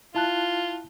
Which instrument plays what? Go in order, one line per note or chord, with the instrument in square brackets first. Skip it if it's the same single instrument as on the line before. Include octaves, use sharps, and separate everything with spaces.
[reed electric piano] E4 A5 F#6 [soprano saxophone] F4